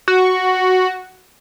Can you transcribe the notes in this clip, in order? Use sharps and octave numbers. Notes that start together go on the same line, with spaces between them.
F#4